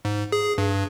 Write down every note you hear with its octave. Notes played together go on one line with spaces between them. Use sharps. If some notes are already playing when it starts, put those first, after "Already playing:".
G#2
G#4
G2